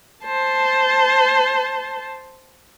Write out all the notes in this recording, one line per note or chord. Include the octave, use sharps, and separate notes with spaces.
C5 A5